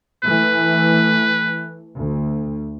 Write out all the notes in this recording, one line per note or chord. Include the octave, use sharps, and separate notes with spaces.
E3 A3 B4
D2